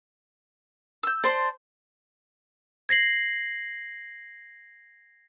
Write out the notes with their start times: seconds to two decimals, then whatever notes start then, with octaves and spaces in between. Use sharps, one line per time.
1.03 E6 G6
1.24 C5 D5 A5 C6
2.89 G#6 A#6 C7 F#7